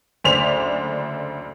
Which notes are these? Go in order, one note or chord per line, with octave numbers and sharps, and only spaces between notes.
F#1 D2 C5 D5 B6 F7